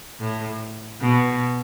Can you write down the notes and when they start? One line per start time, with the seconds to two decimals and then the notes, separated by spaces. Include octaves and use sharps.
0.20 A2
1.00 B2